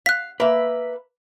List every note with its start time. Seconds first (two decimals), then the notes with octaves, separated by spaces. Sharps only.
0.06 F5 F#6 B6
0.40 A#3 B4 E5